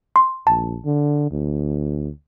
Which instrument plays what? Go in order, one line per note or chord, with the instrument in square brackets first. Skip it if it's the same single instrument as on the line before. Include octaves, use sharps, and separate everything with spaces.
[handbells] C6
[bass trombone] A#1 [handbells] A5
[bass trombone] D3
D2